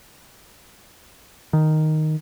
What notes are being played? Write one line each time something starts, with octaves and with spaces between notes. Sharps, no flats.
D#3